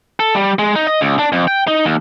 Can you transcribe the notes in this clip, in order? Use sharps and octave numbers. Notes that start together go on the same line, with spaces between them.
A4
G3
G#3
D#4
D#5
C#2
D4
F2
G5
D#4
D#2